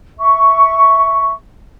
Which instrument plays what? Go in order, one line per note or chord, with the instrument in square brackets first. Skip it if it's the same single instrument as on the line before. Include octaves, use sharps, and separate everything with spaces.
[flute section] E5 C#6